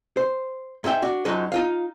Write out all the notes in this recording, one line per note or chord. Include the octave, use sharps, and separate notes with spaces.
C5
G#2 G#4 E5 G5
D4 F#4
F#2 F3 F#3 G#3 D#4
D#4 F4 F5